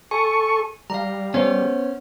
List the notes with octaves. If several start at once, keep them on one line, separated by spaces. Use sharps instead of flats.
A4 G#5 C#6
G3 F5 A#5
B3 C#4 C5 C#5